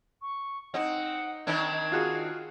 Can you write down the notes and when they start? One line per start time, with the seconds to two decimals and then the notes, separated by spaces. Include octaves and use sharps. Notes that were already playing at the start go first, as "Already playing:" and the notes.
0.22 C#6
0.74 C4 D#4 F#5
1.47 D#3 C4 D4 G#6
1.92 F4 F#4 G#4